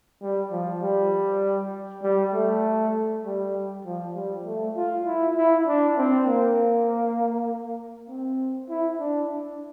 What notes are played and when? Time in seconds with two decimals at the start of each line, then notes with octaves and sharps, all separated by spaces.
0.22 G3
0.51 F3
0.82 G3
2.03 G3
2.33 A3
3.25 G3
3.85 F3
4.16 G3
4.45 A3
4.76 F4
5.06 E4
5.37 E4
5.66 D4
5.97 C4
6.26 A#3
8.09 C4
8.69 E4
8.99 D4